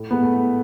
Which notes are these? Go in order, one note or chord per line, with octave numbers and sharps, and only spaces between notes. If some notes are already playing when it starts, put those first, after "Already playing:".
Already playing: A2
G#3 B3
A3
A2